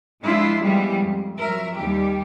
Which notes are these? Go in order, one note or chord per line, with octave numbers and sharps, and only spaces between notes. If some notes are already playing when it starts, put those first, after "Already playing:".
F3 G#3 D4 E4 F4
E3 F3 G3 G#3 B3
F2
F3 F#3 A#4 E5
D#2 G3 G4